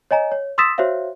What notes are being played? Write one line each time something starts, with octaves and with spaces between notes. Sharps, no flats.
C#5 D#5 G#5 A#5
C#5
C6 D#6 E6 A6 B6 E7
F#4 C5 C#5 E5 F5